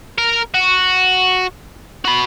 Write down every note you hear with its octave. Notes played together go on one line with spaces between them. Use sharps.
A#4
F#4
F#4 B5